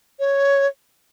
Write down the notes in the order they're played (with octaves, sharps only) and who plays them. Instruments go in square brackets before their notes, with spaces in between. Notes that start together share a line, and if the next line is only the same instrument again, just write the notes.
[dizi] C#5